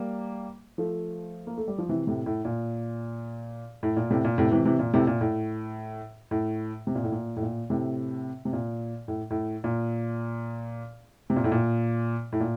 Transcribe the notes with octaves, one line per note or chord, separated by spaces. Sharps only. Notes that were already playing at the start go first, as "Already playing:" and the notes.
Already playing: G3 A#3
F3 A3
A#3
A3
G3
F3
C3 E3
A2 C3
A2
A#2
A2
A#2
A2 C3
A#2
A2 C3
C3 E3
C3 E3
A#2
A2 C3
A#2
A2
A2
C3
A#2
A2
A#2
A2
A#2
A2 C3
C3
A#2
A2
A2
A#2
C3
A#2
A2
A#2
A2
A#2